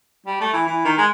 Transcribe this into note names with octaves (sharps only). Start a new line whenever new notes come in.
G3
A3
E3
E3
D#3
G#3